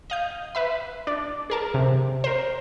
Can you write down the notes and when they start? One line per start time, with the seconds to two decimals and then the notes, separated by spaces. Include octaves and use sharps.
0.10 D#5 F5 G6
0.55 B4 E5 B5
1.07 D4
1.50 G#4 A#4 A5
1.74 C3
2.24 A#4 C5